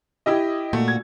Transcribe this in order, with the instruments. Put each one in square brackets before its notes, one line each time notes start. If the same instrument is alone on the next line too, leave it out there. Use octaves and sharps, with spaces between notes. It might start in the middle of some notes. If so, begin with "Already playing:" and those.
[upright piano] E4 G4 D#5
[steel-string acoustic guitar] A#2 F#4 [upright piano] A3
[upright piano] G#6